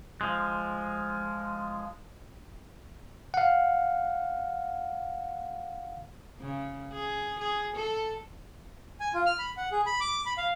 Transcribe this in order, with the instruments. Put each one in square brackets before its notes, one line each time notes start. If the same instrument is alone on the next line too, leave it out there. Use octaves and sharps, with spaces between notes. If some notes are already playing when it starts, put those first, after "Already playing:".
[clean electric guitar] F3 G#3
[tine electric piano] F5 F#5
[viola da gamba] C#3
G#4
G#4
A4
[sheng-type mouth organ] G#5
F4
F6
B5
F#5
G#4
B5
D6
B5
F5